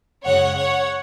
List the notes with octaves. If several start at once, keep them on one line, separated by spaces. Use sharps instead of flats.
F#2 C#3 G#3 C#5 F#5
C#5 F#5